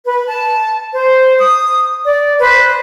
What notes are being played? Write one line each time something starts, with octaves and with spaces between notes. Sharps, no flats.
B4
A5
C5
D#6
D5
B4 C5